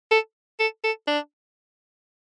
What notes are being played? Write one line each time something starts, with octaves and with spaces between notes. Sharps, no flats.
A4
A4
A4
D4